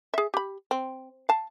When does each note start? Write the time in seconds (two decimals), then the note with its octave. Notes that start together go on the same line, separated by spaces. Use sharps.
0.14 G#4 E5
0.34 G4 B5
0.71 C4
1.29 F5 A5